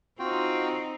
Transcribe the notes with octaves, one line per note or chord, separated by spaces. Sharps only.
C4 D#4 F4 F#4 G5